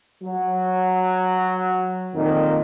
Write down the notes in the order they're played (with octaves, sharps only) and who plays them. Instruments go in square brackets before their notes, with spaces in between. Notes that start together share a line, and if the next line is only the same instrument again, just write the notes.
[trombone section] F#3
F2 A#2 D#3